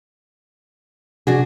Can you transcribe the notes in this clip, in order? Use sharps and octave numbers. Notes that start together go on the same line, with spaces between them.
C3 F3 D4 F#4 G#4